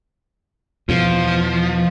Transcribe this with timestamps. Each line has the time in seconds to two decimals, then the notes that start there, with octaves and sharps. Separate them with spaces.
0.89 E2 B2 F3